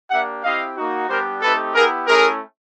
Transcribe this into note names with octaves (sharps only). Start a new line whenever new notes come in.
A#3 D4 G4 E5 F#5
C4 E4 G4 D#5 F5
A#3 D#4 F#4
G3 B3 D4 G4 A#4 C5
A3 C4 D#4 G4 A4 B4
B3 E4 G4 G#4 A#4
A3 C#4 E4 G#4 A#4